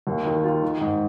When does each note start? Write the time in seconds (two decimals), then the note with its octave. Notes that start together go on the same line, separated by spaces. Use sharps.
0.07 D#2
0.25 D#3
0.44 F4
0.63 D#3
0.81 G#2